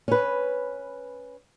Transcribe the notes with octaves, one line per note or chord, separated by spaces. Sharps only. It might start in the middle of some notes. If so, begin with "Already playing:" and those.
C#4 B4